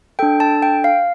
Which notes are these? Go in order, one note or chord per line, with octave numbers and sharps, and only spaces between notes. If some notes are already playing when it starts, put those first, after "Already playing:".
D4 A4 G5
A5
G5
F5